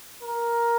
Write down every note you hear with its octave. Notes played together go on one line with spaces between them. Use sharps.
A#4